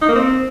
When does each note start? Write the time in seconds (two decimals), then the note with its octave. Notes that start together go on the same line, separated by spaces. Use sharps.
0.01 D#4
0.09 A#3
0.16 C4